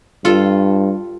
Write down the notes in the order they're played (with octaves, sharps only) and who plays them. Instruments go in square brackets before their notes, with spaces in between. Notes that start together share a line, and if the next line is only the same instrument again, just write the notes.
[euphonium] G2 [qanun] F4 A4